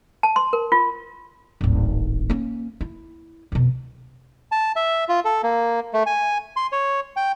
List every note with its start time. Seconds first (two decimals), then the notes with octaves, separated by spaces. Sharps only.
0.23 A5
0.36 C6
0.53 A#4
0.72 F4
1.61 D1 G#1
2.30 A#3 C#4
2.81 E4
3.52 F2 B2
4.52 A5
4.76 E5
5.09 F4
5.25 A4
5.43 A#3
5.94 A3
6.06 G#5
6.56 C6
6.72 C#5
7.16 G5